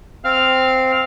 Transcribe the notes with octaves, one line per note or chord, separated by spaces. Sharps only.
C4 F5 F6